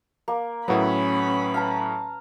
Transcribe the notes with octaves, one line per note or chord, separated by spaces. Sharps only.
A#3
A2 F#3 B3 C#4 E4 B5
F5 A5 A#5